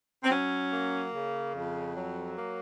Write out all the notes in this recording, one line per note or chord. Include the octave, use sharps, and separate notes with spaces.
C4
F#3 C#4
A#3
C#3
F2
F#3
A#3